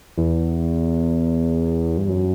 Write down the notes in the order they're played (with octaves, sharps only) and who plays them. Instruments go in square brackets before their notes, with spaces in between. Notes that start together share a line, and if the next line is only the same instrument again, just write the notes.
[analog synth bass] E2
G2
F#2